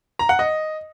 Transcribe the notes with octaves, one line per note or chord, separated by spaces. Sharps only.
A#5
F#5
D#5